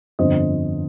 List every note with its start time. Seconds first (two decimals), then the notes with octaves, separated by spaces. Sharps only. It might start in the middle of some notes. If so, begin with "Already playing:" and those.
0.19 G1 F2 D3 C5 D#5